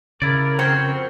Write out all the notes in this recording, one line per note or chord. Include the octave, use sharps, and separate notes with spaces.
C#3 E4 A#4 D5
F2 C4 F#4 C#5